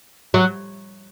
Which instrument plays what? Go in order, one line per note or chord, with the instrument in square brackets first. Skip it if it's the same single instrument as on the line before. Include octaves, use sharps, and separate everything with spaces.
[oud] F#3